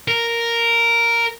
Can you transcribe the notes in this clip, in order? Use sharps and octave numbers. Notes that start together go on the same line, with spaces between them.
A#4